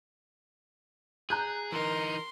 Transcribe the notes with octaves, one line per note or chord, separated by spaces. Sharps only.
G#4 A#5 F#6 G6
E3 D#4 A#4 C6